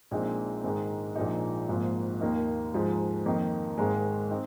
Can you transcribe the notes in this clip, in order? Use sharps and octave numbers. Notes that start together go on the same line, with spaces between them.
A#1 A#2 G#3 C4 D#4
G#2 D#3 G#3 D#4
A#1 A#2 F3 G#3 D#4
G#1 G#2 F3 A#3
D#2 D#3 A#3 D#4
G#2 F3 G#3 D#4
F2 D#3 A#3 D#4
G#1 G#2 D#3 G#3
C4 D#4